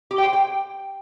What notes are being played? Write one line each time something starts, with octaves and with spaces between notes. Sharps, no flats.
G4
G5
C5
G5